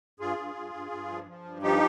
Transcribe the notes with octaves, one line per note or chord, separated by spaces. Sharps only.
G2 F4 G#4
G2
G2
G2
G2
F3
F3
G2
F3 D#4 G4